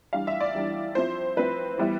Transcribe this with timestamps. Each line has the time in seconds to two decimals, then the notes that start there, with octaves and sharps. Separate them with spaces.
0.13 E3 G3 D4 F5
0.27 E5
0.40 D5
0.55 E3 G3 D4
0.95 F3 C4 E4 C5
1.37 F3 C4 E4 B4
1.78 E3 G3 B3 E4